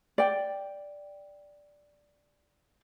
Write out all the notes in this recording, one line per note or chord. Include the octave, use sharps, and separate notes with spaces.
D5 G5